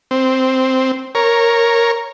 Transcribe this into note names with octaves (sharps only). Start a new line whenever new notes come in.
C4
A#4 C#5